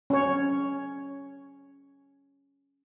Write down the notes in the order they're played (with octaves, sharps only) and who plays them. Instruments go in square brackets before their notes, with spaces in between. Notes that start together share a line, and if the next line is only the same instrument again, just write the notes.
[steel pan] C#4 C#5